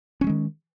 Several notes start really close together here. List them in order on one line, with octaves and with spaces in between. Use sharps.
C#4 F3 G#3 D#3